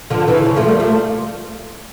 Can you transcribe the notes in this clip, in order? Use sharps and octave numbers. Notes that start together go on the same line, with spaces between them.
D3 F3
C#3 E3
C#3
F3 A3
G3 A#3
F3 A3